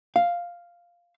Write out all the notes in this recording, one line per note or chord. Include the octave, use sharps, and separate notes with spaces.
F5